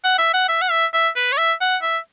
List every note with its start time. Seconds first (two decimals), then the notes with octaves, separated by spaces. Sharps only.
0.04 F#5
0.18 E5
0.34 F#5
0.48 E5
0.61 F#5
0.70 E5
0.93 E5
1.16 B4
1.32 C#5
1.37 E5
1.61 F#5
1.82 E5